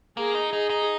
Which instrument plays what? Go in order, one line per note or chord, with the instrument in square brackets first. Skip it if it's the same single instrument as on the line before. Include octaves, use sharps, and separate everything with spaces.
[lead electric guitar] A#3 [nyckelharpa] G#4
[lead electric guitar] D#4
[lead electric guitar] D#4 [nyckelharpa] G#4
[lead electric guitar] D#4